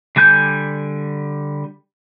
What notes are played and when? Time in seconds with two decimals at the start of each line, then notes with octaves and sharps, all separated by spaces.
0.16 D3 G3 G#5 G6